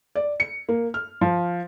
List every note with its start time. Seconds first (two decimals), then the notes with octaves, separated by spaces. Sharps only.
0.15 D5
0.40 C#7
0.69 A#3
0.94 F6
1.21 F3